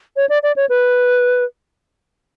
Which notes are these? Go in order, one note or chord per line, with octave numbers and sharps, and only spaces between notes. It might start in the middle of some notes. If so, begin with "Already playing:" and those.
C#5
D5
D5
C#5
B4